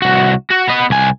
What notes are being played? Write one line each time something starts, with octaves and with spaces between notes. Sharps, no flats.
C2 F#4
F#4
B3 D#5
C2 G#5